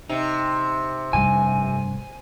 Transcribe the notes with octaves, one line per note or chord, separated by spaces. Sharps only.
C3 D#4
F1 G2 G#5